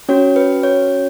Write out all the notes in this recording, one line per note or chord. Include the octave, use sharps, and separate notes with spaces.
C#4 F#4 C#5
B4
C#5